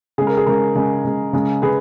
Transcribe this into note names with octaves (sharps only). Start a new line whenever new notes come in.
C#3 G#3 G#4
A#4
G#4
C#3 G#3 A#4
C#3 G#3
C#3 G#3
C#3 G#3
C#3 G#4 B4